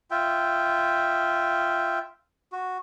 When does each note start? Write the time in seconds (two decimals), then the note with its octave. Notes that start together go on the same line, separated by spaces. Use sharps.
0.11 F4 E5 G5
2.52 F#4